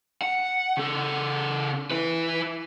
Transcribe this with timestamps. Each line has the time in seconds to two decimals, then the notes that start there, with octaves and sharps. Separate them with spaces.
0.22 F#5
0.77 C#3 A4
1.91 E4 B4